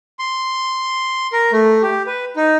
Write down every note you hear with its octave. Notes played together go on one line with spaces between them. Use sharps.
C6
A#4
A3
G4
B4
D#4